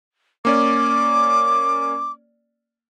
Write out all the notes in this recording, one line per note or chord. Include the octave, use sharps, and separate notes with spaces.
A#3 C#4 D5 D6